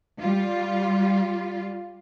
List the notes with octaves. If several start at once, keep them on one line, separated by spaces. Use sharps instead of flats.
G3 F4